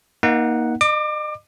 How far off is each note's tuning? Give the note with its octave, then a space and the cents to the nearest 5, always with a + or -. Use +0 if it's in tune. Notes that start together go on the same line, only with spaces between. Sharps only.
A#3 +25 D#4 +15 F#5 +0
D#5 -40 D6 +25